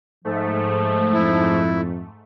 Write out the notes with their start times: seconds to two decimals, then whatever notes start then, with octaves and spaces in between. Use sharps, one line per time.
0.25 G#2 F3 A3
1.14 F2 E4